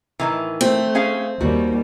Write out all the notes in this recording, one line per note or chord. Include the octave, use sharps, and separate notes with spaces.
A2 D#3 E3
A3 C4
C#4 G#4 F5
D#2 G3 F#4